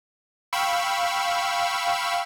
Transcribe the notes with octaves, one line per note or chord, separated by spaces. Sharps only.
F5 G5 B5 C#6 E6